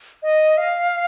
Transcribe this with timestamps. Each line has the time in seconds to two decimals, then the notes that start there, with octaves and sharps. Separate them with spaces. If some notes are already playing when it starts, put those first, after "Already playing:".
0.23 D#5
0.57 F5